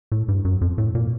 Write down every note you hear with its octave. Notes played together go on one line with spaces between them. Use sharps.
A2
G2
F#2
F2
A2
A#2